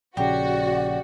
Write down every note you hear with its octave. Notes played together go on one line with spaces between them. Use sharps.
A#1 C#3 F#4 G4 D5